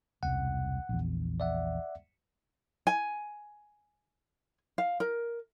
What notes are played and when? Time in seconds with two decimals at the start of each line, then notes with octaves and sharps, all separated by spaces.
0.23 E1 C2 F#5
0.89 A#1 E2
1.40 D5 E5 F#5
2.87 G#5
4.78 F5
5.00 A#4